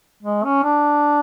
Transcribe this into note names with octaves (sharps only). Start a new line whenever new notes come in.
G#3
C#4
D4